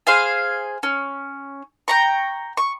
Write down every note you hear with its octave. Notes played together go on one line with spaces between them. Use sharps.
G#4 C5 F5 G#5
C#4
G5 A#5 C#6
C#6